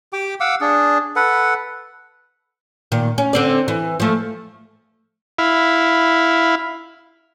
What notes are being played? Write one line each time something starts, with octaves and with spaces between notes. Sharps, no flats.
G4 G5 D6
F5 F#5 D6 E6
D4 G#4
A4 B4 F#5
A#2 D#3
C#4
D3 C4 D5
E3
F3 A3
E4 F5 B5